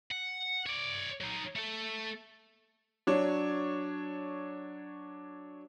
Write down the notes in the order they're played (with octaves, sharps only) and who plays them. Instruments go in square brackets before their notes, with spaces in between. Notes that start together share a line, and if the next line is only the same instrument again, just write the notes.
[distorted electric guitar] F#5
C#5 D5
F#3 D#4
A3 A4
[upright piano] F#3 D4 C#5